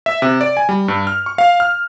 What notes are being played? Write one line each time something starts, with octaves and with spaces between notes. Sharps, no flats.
E5
C3
D5
G#5
G3
G2
F6
C#6
F5
F6